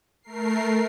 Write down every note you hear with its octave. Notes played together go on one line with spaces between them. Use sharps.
A3 A#4 C7